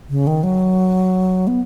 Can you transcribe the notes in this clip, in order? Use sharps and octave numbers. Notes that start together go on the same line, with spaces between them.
C#3
D#3
F#3
B3